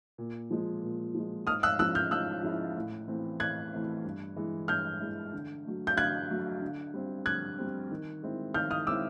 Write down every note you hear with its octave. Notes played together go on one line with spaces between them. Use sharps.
A#2
F3 G#3
A#2
F3 G#3
G#2 D#6 F6
E6 F#6
F3 G#3 C#4 E4 E6 F#6
F6 G6
G#2 E6 F#6
F3 G#3 C#4 E4
A2
E3 A3 C4
A2 F#6 G#6
E3 A3 C4
G2
E3 G#3
G2 F6 G6
E3 G#3
D3
F#3 A3
G6
D3 F#6 G#6
F#3 A3
D3
G3 C4
D3 F#6 G#6
G3 C4
D#3
G#3 C4 E4
D#3 F6 G6
D#6 F6
G#3 C4 E4 D6 E6